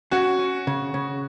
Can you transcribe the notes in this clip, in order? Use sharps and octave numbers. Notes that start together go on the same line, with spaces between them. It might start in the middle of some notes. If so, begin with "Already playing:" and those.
C#4 F#4
C#4
C#3
C#3